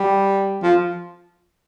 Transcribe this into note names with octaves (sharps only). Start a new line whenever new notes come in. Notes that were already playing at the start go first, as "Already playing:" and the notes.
Already playing: G3
F3